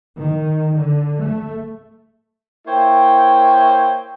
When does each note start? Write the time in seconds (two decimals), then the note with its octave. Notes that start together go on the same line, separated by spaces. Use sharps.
0.17 D#3
0.77 D3
1.23 A3
2.67 A#3 E4 C5 C#5 E5 G5